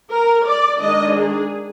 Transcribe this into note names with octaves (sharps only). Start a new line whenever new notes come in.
A#4
D5
D#3 G#3 D4 D#5
G#4